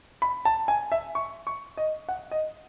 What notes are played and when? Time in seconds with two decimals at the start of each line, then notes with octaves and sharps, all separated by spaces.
0.22 B5
0.45 A5
0.68 G#5
0.92 E5
1.15 C#6
1.47 C#6
1.77 D#5
2.09 F#5
2.31 D#5